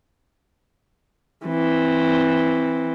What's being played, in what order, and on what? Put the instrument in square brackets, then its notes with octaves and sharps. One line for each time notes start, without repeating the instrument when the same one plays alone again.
[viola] E3 C4